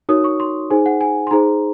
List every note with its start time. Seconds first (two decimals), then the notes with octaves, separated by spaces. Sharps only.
0.09 D#4 F#4 A#4 C#5 D#6
0.24 C#6
0.40 C6
0.70 D#4 G#4 C5 G#5
0.86 F#5
1.01 G#5
1.27 C6
1.31 D#4 G#4 C5 A#5